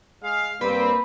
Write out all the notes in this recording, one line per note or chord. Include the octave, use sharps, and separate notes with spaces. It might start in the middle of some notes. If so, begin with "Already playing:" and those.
G#3 G#4 F5
G2 G3 A#3 C4 B4